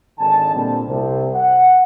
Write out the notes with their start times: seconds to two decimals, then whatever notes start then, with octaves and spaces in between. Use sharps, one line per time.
0.19 G#1 D3 D#4 G#5 A5
0.53 A#2 D3 G3 C4
0.88 C2 C3
1.35 F#5